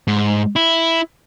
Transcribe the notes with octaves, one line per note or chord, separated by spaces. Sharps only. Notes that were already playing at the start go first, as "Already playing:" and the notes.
G#2
E4